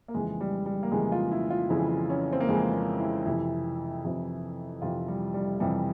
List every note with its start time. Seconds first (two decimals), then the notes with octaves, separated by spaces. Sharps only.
0.08 A#3
0.14 F2 C#3 E3 G#3
0.40 G3
0.66 G3
0.83 A#3
0.92 F2 C#3 E3 G#3
1.12 F4
1.31 E4
1.50 F4
1.70 F2 C#3 E3 E4
2.10 C#4
2.33 C4
2.40 A#3
2.49 F2 C#3 E3 G#3
2.74 A#3
3.00 E4
3.26 F2 C3 E3 E4
4.05 F2 C3 E3
4.82 F2 C3 E3 F4
5.08 G3
5.34 G3
5.60 F2 C3 E3 G3